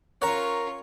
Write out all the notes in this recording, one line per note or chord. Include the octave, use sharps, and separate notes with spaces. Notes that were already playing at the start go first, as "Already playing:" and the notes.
C#4 F4 A#4 C#5 F#5 A#5